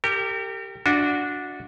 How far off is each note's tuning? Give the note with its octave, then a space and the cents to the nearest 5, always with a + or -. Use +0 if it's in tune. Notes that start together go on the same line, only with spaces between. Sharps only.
G4 +0 A#4 -35
D4 -5 F#4 -20 E5 -40